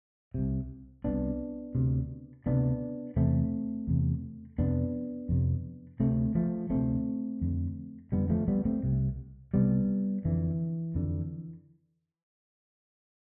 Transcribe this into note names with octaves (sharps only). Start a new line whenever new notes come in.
C2 C3
C2 C3 B3 D4
D2 C3
D2 C3 B3 D4
E2 C3 A3 C4
E2 C3
F2 C3 B3 D4
F2 C3
D2 C3 A3 C4
F3 A3
D2 C3 A3 C4
F2 D3
F2 D3 G3 B3
F3 A3
G3 B3
A3 C4
C2 C3
C2 C3 G3 B3
F2 D3 E3
F2 D3